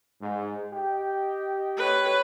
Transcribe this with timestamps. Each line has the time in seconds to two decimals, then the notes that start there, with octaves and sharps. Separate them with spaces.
0.20 G#2
0.73 G4 D#5 G5
1.77 B4 C#5